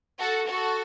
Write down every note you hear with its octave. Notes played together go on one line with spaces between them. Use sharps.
F#4 A4
F#4 A4